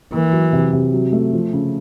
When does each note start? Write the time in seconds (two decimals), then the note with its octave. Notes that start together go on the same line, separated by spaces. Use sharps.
0.12 E3 A#3
0.33 F#3
0.53 C3
0.73 C3
0.94 F#3
1.13 A3
1.33 F3
1.53 C#3